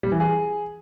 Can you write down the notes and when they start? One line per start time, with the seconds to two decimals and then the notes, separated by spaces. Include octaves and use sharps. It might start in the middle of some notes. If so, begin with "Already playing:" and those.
0.03 G3
0.12 E3
0.20 G#4